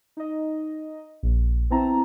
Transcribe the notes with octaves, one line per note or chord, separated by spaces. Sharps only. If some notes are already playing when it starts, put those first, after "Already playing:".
D#4 D#5
A#1
B3 C4 E4 A5 A#5